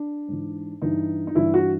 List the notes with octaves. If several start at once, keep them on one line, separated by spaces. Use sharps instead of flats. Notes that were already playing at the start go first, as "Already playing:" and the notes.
Already playing: D4
G#2 E3
G2 E3 D#4
D#4
G2 E3 E4
F#4